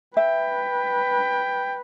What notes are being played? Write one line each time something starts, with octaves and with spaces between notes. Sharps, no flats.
B4 E5 G5